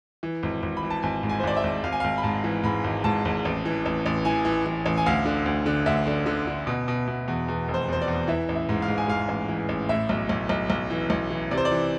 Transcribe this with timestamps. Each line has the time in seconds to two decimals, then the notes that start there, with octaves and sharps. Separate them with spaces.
0.23 E3
0.43 G#1
0.63 G#1
0.77 B5
0.83 E3
0.90 A5
1.02 G#1 G#5
1.23 G#2
1.29 G#5
1.40 C5
1.43 G#1 D5
1.57 E5
1.63 G#1
1.83 G#1 F5
1.92 G#5
2.00 G#1 F5
2.18 B5
2.23 G#2 A5
2.44 E3
2.64 G#2 B5
2.84 G#1
3.04 G#2 A5
3.25 G#1
3.45 A1
3.65 E3
3.86 A1
4.06 A1
4.25 E3 G#5
4.45 E3
4.66 E3
4.86 A1
4.97 G#5
5.06 D2 F5
5.25 D3
5.46 D2
5.66 D3
5.86 D2 E5
6.07 D3
6.26 D3
6.47 D3
6.67 B2
6.88 B2
7.07 B2
7.28 E2
7.48 E2
7.68 F1
7.74 C5
7.88 E2 C5
8.02 D5
8.08 E2
8.28 E3 E5
8.49 A1
8.55 E5
8.69 G#2
8.82 F5
8.88 G#2
8.98 G#5
9.08 G#2 F5
9.28 A1
9.49 E3
9.69 A1
9.89 A2 E5
10.09 B1
10.29 B1
10.49 B1
10.70 B1
10.90 E3
11.10 B1
11.31 E3
11.51 C3 D5
11.58 C5
11.65 D5
11.71 E3